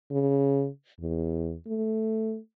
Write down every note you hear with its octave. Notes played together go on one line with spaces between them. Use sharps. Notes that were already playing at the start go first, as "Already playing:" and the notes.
C#3
E2
A3